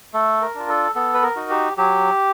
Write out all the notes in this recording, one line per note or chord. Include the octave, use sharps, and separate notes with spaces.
A3 A4
A#4
D4 F4
A4
B3 A4
B4
A#4
D#4 F#4
G4
F#3 G4